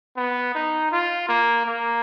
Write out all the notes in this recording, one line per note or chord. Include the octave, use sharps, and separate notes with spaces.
B3
D#4
F4
A#3
A#3